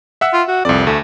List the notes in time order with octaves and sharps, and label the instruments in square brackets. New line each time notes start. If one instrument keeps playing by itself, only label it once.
[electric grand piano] E5 F#5 E6
[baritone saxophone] F4
F#4
[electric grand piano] C2 D5 [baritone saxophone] F2
[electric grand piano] D2 [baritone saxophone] A3